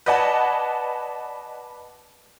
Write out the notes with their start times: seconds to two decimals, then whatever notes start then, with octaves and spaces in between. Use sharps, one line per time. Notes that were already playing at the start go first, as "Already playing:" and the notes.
0.06 B4 D5 D#5 F#5 G#5 A5